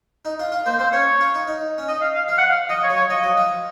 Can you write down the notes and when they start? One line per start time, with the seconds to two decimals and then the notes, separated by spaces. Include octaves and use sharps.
0.25 D#4
0.39 F4
0.52 F4
0.66 A#3 C5
0.79 C4 C5
0.93 C#4 C#5
1.21 F4
1.34 D#4
1.47 D#4
1.78 C#4
1.88 D#4 D#5
2.01 F5
2.15 F5
2.28 F3 F5
2.38 F#5
2.49 F5
2.69 F3 D#5
2.83 C#5
2.90 F#3
2.96 C#5
3.10 F3 D#5
3.23 F#3
3.37 F3